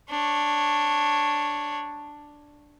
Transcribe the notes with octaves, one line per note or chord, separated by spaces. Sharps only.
D4 C#5